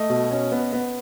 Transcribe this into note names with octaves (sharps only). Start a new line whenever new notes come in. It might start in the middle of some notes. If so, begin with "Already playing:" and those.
Already playing: A3 D#5
B2
C#4
B3
B3